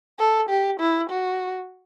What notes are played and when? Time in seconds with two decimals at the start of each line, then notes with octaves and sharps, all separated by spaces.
0.19 A4
0.49 G4
0.80 E4
1.09 F#4